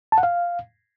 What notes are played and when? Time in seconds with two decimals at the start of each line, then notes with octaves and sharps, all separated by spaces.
0.12 A5
0.18 F#5
0.23 F5